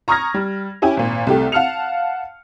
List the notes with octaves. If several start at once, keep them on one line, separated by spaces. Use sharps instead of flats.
A#5 C#6 D#6 F6 G#6 A#6
G3
C#4 E4 G4 G#5
G#1 A#2
C2 A3 G4
F5 F#5 A5 F6 C#7 F7